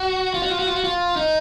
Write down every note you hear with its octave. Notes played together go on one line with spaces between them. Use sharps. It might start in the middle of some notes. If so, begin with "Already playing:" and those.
Already playing: F#4
F4
F#4
F4
F#4
F4
F#4
F4
D#4